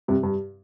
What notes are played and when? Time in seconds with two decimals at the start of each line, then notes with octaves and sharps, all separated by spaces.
0.08 G2 C3
0.23 G2